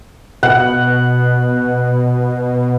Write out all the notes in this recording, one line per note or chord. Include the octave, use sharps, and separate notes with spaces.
B2 F#5